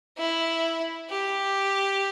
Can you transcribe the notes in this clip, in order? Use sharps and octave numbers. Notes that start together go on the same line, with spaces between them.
E4
G4